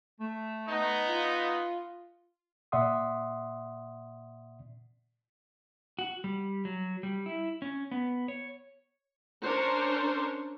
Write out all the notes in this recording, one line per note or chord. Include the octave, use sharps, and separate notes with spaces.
A3
B3 D#4
F4
A#2 D5 E5 F#5 C6 D#6
F#4
G3
F#3
G3
E4
C#4
B3
C#5
C#4 D4 A#4 C5 C#5